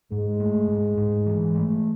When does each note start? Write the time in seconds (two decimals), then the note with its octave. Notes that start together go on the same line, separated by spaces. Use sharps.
0.11 G#2 G#3
0.40 A3
0.68 G#2
0.97 G#2
1.26 E3
1.55 A3